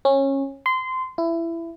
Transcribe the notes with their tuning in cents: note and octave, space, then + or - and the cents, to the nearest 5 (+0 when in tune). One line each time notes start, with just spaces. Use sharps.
C#4 -20
C6 -20
E4 +20